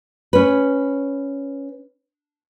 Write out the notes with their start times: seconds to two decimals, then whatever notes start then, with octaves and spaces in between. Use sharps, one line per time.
0.33 C#4 B4